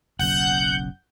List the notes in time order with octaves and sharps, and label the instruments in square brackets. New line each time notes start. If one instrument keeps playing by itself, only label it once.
[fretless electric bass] F#1 B1 F#2 [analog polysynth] F#5 G6 [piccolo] F#7